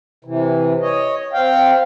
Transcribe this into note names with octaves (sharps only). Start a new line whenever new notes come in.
C3 E3
C#5 D#5
C4 F5 G5